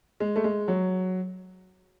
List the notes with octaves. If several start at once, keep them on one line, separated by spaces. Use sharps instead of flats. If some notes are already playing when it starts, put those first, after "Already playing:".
G#3
A3
G#3
F#3